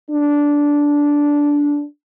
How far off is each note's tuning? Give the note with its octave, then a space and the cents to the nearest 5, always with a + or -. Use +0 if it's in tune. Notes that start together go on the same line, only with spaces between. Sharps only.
D4 -10